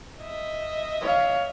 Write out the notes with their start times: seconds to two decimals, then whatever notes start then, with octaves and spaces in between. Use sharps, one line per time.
0.21 D#5 E5
1.01 C#5 F5